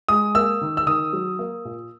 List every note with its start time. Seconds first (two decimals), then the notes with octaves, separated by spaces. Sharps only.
0.08 G#3 D#6
0.35 A#3 E6
0.61 D#3
0.77 E6
0.87 D#3 D#6
1.13 F#3
1.39 A#3
1.65 A#2